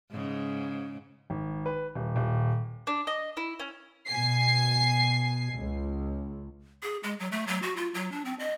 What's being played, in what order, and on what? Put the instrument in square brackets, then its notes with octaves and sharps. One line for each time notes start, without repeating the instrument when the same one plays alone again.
[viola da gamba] G#2 C#3
[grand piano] G#1
B4
D#1
D#1
[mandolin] D4
D#5
E4
C#4
[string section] B2 G#5 C7
C#2
[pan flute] G#4
G#3
F#3
A3
F#3
F#4
F4
F#3
D4
C4
D#5